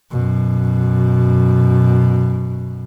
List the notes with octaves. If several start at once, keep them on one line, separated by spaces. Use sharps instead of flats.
F#2 B2